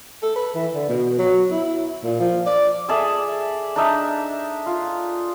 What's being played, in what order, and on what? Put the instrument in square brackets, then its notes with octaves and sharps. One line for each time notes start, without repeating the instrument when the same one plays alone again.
[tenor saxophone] A4
B4
E3
D3
B2
F#3
E4
A#2
F3
D5
[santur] G#4 A4 D5 E5
D4 D#4 E5
F4